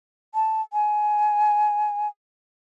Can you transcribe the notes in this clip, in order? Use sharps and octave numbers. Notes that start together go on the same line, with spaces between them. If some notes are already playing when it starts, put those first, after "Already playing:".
A5
G#5